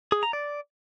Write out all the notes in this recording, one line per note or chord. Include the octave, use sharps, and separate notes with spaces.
G#4
A#5
D5